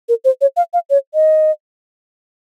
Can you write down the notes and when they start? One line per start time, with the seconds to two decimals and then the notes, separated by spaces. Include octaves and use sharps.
0.09 A#4
0.25 C5
0.41 C#5
0.57 F5
0.74 F5
0.90 C#5
1.14 D#5